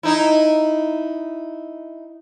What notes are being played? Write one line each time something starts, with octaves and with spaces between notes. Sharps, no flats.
D#4 E4